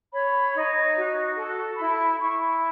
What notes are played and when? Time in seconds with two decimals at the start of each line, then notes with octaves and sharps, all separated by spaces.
0.12 C#5 B5
0.54 D#4
0.96 F#4
1.36 A4
1.77 E4 B5
2.19 E4 C#6